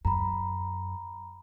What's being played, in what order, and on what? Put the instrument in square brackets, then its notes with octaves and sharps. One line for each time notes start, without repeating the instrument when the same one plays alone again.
[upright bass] F#2 [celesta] A#5 B5